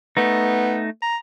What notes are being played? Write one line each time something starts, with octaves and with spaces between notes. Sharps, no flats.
A3 B3 D#4
A#5